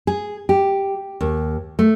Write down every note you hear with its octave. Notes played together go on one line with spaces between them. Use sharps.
G#4
G4
D#2
A3